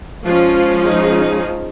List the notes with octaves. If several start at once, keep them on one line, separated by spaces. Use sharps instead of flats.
F3 G#3 C#4 F4
D#4 G#4